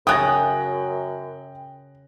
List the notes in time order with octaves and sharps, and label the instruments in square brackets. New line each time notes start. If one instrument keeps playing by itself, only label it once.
[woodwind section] F#2 [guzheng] C#3 C#4 [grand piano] G5 F#6 A#6 [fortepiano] D#6